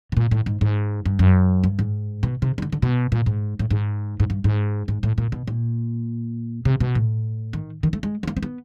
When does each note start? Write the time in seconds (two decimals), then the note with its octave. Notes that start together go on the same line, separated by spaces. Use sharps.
0.12 B2
0.17 A#2
0.31 A2
0.46 G#2
0.61 G#2
1.05 G2
1.19 F#2
1.64 G2
1.79 G#2
2.23 B2
2.42 C3
2.58 D#3
2.62 D3
2.72 D3
2.82 B2
3.12 A#2
3.26 G#2
3.59 A2
3.71 G#2
4.20 G#2
4.30 G2
4.44 G#2
4.88 G#2
5.03 A2
5.18 A#2
5.32 B2
5.47 A#2
6.65 C3
6.80 B2
6.95 A2
7.53 D#3
7.83 D#3
7.93 A3
8.03 G#3
8.23 B3
8.28 A#3
8.37 C4
8.43 B3